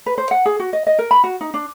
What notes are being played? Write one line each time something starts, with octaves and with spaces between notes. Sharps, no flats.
B4
C5
F#5
G#4
F#4
D#5
D#5
A#4
B5
F#4
D#4
D4